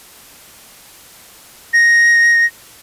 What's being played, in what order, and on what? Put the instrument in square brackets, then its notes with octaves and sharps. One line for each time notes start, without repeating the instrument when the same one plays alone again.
[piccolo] A#6